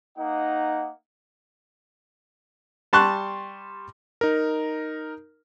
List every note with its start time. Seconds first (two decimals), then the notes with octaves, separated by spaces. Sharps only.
0.17 A#3 D#4 D#5 F#5
2.93 G3 A5 C6 C#6 F#6
4.21 D#4 A#4